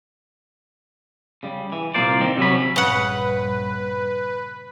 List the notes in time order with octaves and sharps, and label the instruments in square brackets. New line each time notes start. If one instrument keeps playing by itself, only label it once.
[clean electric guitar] C#3 G3
E3
C2 A#2 A#3 C5 D5
D#3 C4
C3 F#3 C#4 B5
[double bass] A#1 G2 [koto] C#3 F#5 [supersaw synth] B4